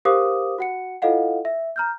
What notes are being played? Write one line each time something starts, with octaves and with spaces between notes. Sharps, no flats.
G4 A#4 C5 F5 D6 D#6
F#4 F#5 C#7
E4 F4 A4 D#5 F5 F#5
E5
A#5 F6 G6